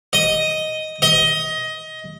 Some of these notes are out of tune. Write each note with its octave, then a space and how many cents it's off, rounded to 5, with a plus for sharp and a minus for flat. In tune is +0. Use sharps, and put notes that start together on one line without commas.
D#5 +5
D#5 +20